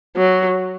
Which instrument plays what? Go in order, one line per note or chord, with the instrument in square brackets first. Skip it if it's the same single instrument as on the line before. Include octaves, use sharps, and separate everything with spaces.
[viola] F#3